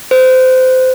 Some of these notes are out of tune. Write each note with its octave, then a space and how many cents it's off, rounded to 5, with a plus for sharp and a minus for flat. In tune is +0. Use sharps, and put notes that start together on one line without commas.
C5 -25